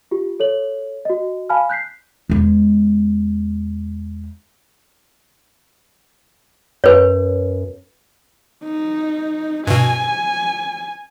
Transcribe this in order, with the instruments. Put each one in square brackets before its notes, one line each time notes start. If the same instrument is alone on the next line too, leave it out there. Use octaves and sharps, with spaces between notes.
[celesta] F4 G4
A4 C#5 F#7
F#4 D#5
F5 G#5 A5 B5 F6
F#6 G6 B6 C7
[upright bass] E2 G#3
[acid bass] F#2 [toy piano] B4 C#5
[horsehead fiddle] D#4
[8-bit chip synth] G2 B2 [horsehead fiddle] G#5